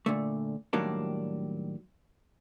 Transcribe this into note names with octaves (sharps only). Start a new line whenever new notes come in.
A#2 D3 A3
A2 D#3 F#3 G3 A#3 D4